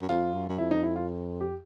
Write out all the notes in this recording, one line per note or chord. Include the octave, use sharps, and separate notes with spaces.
F#2
F2 F4
F#2
F#2
F2 E4
D#4
E4
F4
G4